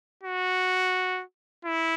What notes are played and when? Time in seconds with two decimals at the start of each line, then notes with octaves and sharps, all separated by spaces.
0.23 F#4
1.65 E4